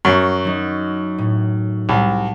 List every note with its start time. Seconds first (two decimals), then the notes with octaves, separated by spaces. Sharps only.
0.05 F#2 F#5 A#5 C#6
0.45 F#3 D#4
1.18 A2
1.89 C2 A5